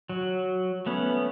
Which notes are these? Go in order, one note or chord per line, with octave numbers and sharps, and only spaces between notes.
F#3
A3 B3 C#4